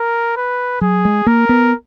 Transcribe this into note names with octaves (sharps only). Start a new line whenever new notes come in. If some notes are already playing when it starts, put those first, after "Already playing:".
Already playing: A#4
B4
F#3 G#4
G#3
A#3 A#4
B3